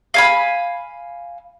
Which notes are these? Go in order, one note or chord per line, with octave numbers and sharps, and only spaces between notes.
F5 G#5 B5